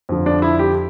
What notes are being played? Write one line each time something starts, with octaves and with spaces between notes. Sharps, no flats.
F2 D3 F3
D4
E4
G4